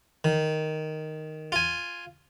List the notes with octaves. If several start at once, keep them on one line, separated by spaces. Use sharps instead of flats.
D#3
F4 G#5